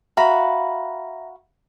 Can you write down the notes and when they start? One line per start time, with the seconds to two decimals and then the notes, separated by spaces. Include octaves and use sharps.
0.17 F#4 E5 F5 A#5 B5 A#6